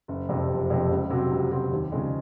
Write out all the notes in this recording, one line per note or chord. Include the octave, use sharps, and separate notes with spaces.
F#1
F2 C3 F3
F#1
F2 C3 F3
C#2
C3 F#3 C4
C#2
C3 F#3 C4
D#2
C#3 F3 G#3 C4